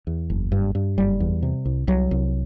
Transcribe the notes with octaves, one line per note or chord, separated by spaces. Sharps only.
E2
F#1
G2
G2
F#1 G3
E2
C3
C2
C2 F#3
C2